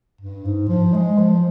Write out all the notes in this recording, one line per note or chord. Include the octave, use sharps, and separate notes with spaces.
G2
G#2
F3
G#3
F3